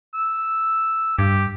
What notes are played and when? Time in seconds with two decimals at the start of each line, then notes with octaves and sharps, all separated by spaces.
0.15 E6
1.19 G2 G4